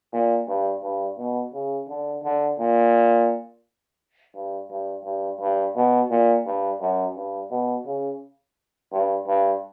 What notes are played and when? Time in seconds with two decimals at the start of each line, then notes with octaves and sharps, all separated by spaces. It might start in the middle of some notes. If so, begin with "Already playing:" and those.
0.13 A#2
0.48 G2
0.83 G2
1.18 B2
1.54 C#3
1.89 D3
2.23 D3
2.59 A#2
4.35 G2
4.70 G2
5.05 G2
5.41 G2
5.76 B2
6.10 A#2
6.46 G2
6.81 F#2
7.16 G2
7.51 B2
7.86 C#3
8.92 G2
9.27 G2